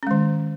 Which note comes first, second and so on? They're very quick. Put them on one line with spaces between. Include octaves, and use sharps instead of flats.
C#4 G#3 D#3